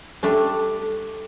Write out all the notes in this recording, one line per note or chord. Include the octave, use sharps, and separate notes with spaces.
G3 A3 D4